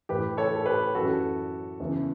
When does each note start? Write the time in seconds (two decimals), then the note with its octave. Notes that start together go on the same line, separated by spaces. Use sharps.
0.09 A2 E3 G4 B4
0.37 A4 C#5
0.56 A4
0.66 G4 B4
0.95 F#2 E3 F#4 A4
1.80 E2 C#3 E3